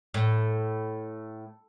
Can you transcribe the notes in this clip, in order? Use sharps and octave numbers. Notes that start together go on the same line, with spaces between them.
A2